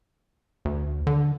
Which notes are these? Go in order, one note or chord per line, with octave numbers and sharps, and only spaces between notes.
D2
D3